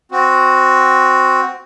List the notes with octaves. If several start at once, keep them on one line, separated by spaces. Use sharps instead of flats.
C4 F#4